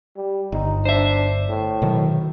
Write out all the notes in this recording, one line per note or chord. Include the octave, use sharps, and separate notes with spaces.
G3
G1 D#4
D4 C5 E5
A2
B2 D#3 F#3